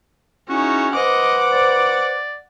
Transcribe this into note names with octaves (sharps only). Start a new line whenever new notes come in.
C#4 D#4 E4 F#4 G#4
B4 C5 D#5 F#5 D6
D5